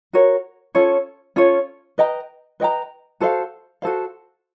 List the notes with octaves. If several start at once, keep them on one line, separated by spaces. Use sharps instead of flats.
F#4 A#4 C#5
C#4 F4 A4 C#5
C#4 F4 A4 C#5
B4 D#5 G5 A#5
B4 D#5 G5 A#5
F#4 A4 C5 F5
F#4 A4 C5 F5